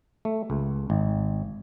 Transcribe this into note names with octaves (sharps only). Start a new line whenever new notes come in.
A3
C#2
G#1